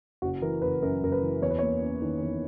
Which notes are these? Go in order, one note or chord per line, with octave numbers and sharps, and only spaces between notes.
F#1 F#4
E3 A#4
F#1 B4
F#2 A#4
F#1 A#4
B4
E3
E2 C#5
B4
A#3 C#5
C#4
D#3
E2